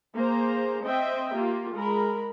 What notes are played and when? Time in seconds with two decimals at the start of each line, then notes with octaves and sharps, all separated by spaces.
0.15 A#3 G#4 C5 A#5
0.85 C4 C5 D#5 E5 G5
1.34 A#3 F4 G4
1.75 G#3 A#4 B5